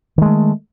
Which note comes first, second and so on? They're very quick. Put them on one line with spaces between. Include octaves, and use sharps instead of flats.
D#3 G#3 A3